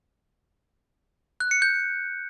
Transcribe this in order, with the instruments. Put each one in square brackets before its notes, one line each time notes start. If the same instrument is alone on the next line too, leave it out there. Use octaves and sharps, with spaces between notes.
[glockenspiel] F#6
C#7
G6